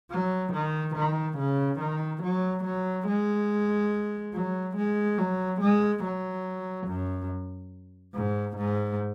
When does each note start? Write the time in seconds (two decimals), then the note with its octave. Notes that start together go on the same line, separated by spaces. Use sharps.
0.11 F#3
0.53 D#3
0.96 D#3
1.38 C#3
1.80 D#3
2.23 F#3
2.65 F#3
3.08 G#3
4.34 F#3
4.77 G#3
5.18 F#3
5.61 G#3
6.03 F#3
6.88 F#2
8.15 G#2
8.57 G#2